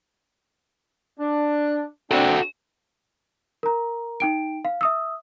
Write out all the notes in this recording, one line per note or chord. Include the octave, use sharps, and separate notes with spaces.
D4
C4 D4 F#4 A4
A#4 A#5
D#4 G5 D7
F5
E5 D#6 E6